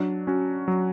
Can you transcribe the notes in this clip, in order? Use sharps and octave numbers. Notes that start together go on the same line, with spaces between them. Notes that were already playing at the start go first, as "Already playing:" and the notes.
Already playing: F#3 D4
C#4 F#4
F#3